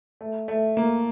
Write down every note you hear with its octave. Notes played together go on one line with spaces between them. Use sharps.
A3
A3
A#3